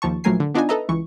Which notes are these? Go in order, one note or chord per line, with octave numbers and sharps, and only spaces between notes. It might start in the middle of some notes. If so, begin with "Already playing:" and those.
D#2 F3 A5 C#6
A#1 F#3 A3 A#4 G#5 C7
D3
B3 D4 D#4 F4 D#5 G#5
A4 B4 D#5 E5 A#5
C#2 E3 C#6